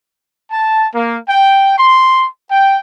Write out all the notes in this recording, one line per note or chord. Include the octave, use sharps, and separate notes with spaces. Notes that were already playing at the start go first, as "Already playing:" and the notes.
A5
A#3
G5
C6
G5